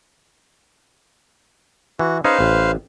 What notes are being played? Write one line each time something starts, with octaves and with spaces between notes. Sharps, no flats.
E3 F#4
C#4 D#4 G#4 B4 C5 F5
A1